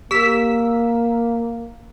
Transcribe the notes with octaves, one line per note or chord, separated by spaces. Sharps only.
A#3 G4 A#4 E6 B6